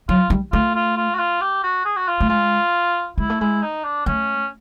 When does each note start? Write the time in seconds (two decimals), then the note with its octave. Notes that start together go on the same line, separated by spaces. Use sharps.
0.09 F#3 F4
0.30 G3
0.52 A3 F4
0.75 F4
0.97 F4
1.15 F#4
1.19 F4
1.41 G4
1.64 F#4
1.85 G#4
1.96 F#4
2.08 F4
2.20 A3
2.29 G#3 F4
3.18 G#3 E4
3.30 A3
3.41 G#3 E4
3.63 D#4
3.84 D4
4.06 A3 C#4